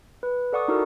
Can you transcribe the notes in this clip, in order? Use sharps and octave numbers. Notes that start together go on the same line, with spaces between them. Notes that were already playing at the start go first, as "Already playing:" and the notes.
B4
A4 D5 F#5 C#6 D#6
D#4 E4 F#4 A4 A#4